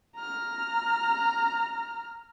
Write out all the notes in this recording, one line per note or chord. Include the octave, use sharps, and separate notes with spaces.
A#5 F6